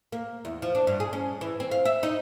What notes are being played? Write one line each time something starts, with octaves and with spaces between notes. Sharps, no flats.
A#3
E2
F3
D4
G2
G#4
C#4
E3
C4
F5
E5
D#4